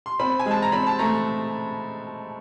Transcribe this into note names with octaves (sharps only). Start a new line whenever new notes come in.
C6
C4 B5
G#5
G#3 A5
A#5
C4 B5
A5
A3 A#5